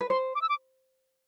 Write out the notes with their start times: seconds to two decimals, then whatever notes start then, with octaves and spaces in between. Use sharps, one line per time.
0.01 B4
0.10 C5 C6
0.35 D6
0.42 E6
0.49 D6